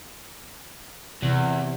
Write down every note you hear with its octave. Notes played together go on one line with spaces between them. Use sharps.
E2 C3